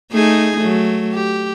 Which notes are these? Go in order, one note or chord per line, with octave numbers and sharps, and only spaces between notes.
A3 D#4 G#4
F#3 A3
G4